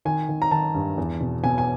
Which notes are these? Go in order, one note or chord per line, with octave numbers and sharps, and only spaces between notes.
D#3 G#5
D#3
A#5
D#3 A5
G2
E2
B2
B2 G#5
G#5